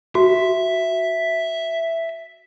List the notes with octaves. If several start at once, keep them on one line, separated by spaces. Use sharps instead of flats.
F#4 E5